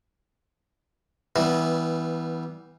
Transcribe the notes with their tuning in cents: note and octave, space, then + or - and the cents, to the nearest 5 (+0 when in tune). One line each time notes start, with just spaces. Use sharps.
E3 -20 G3 -10 B3 +0